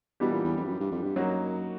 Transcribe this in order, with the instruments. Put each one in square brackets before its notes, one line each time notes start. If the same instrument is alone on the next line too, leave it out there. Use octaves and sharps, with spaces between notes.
[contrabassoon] B2 [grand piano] E3 G3 B3 D4 G4
[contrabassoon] A#2
E2
F2
G2
F#2
G2
F2
G2
[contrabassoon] F#2 [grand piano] F#3 A#3 D#4 F#4